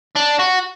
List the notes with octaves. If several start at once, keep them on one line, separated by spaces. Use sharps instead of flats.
D4
F#4